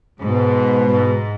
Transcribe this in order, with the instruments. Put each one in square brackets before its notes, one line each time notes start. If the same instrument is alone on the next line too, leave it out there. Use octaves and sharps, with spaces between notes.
[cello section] G#2 [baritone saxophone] B2
[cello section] G#2